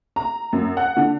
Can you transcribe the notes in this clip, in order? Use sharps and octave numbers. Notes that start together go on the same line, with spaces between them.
A#5
F#2
F#5
D3